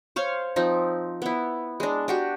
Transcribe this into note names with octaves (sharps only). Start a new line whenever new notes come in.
C5 C#5 F5
F3 C4 D#4
B3 E4
G#3 D4
D4 F#4 G4